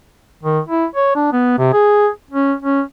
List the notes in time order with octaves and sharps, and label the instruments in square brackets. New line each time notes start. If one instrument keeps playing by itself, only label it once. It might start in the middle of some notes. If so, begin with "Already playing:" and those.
[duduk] D#3
E4
C#5
D4
B3
C3
G#4
C#4
C#4